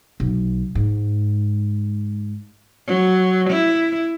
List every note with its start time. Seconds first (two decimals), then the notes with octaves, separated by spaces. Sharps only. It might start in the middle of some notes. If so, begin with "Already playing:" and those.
0.20 B1
0.75 G#2
2.87 F#3
3.50 E4